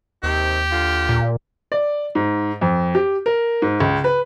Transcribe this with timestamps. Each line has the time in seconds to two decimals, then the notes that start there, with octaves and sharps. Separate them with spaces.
0.23 D#2 C3 D#3 C4 G4
0.72 D3 F4
1.09 A#2
1.72 D5
2.15 G#2
2.61 F2
2.95 G4
3.26 A#4
3.62 G#2
3.80 C#2
4.04 B4